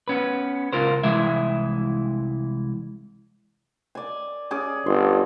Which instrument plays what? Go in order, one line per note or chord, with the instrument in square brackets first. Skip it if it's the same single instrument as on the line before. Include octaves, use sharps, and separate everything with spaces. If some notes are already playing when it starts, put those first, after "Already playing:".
[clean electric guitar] B3 C#4 B4
C#2 F4 A#4 C5
C2 E3 G#3 E4 E5
[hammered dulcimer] D5 G#5
C#4 G#4 D5
[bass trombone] G1 [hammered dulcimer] C6